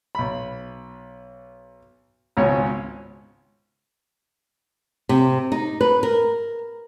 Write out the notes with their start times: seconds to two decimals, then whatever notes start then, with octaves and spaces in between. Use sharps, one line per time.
0.15 B1 B5
2.37 G#1 C#2 G#2 B2 C#5 G#5
5.09 C3
5.52 D#4
5.81 B4
6.03 A#4